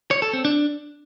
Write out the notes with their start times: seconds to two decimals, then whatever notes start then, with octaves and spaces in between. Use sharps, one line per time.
0.11 C#5
0.22 A4
0.33 C4
0.45 D4